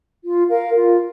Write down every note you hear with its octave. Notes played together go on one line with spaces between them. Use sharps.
F4
A#4 F5
F4